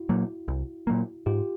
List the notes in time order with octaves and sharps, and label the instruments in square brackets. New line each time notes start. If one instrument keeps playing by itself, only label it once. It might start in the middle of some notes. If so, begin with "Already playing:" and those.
Already playing: [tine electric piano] E4 F#4
[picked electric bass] A#2 F#3 A#3
C2
A#2 F#3 A#3
[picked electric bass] G#2 [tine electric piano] F4 G4